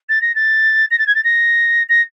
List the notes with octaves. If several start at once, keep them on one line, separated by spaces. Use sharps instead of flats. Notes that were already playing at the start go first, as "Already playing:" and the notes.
A6
A#6
A6
A#6
A6
G#6
A6
A#6
A#6